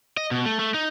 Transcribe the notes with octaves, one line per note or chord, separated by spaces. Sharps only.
D#5
B2
A3
A3
D#4